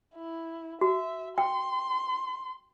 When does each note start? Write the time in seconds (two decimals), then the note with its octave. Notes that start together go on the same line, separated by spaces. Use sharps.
0.15 E4
0.81 F#4 E5
1.38 G5 C6